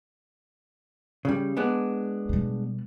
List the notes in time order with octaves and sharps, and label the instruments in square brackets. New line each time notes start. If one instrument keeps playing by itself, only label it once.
[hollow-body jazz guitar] C#3 G3
G#3 B3 D4
[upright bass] B2 G3